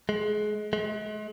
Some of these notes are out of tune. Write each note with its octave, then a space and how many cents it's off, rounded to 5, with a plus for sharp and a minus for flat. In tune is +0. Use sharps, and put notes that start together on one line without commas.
G#3 +25
G#3 +40